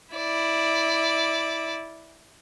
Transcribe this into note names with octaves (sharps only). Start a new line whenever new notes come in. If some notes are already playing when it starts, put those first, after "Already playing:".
E4 D5